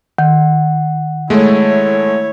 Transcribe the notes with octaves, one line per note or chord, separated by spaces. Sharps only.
D#3 F#5
G#3 A3 E4 C#5